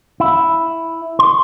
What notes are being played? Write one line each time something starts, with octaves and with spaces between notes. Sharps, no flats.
E4
C6